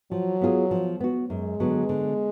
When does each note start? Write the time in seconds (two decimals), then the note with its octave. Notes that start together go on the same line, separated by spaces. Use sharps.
0.11 F3 F#3
0.41 B3 F4 G#4
0.71 F3
1.00 B3 F#4
1.30 F#2 G#3
1.60 D3 F#3 B3
1.89 D3